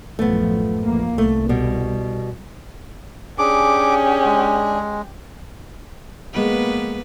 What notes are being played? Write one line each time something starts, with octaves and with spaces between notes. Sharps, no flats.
A1 F#2 F3 A3 B3
A#1 A#3
C2 A3
B2 G3
C#4 D4 G4 G#4 D6
G#3
F2 G#3 A#3 B3 B4